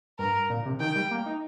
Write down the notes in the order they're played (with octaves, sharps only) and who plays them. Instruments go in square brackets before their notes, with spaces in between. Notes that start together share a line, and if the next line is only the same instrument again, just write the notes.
[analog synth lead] G2 [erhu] A#4
[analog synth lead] A#2
C3
[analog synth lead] D#3 [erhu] G5
[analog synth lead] G3
A#3
D#4